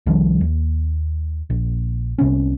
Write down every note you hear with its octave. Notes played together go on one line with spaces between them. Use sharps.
C2 D#3 F3 G3
D#2
A#1
C2 C3 B3 C#4